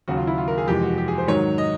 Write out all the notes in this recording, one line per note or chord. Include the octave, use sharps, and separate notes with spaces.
D#2 C#3 F#3 F#4
F4
E4
F4
A#4
G#4
F2 C3 E3 G#3 G4
F#4
G4
G#4
C5
G#2 D#3 F#3 C#5
D#5